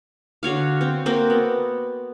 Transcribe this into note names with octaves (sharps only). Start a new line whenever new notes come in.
D3 F#4 C#5 F5
C4
A#3 C4 F#4 A#4
B3